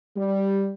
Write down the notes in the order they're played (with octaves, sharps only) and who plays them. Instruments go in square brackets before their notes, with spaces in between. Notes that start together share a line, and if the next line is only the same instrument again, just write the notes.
[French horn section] G3